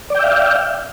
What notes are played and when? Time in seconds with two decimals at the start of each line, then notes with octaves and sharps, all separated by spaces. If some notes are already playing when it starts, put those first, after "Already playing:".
0.10 D5
0.15 G5
0.19 E5
0.24 F5